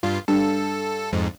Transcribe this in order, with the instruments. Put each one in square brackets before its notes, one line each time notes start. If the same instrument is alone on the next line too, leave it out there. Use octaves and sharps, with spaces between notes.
[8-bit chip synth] G2 F4
[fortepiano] G2 [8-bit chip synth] A4
[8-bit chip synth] F2 G#2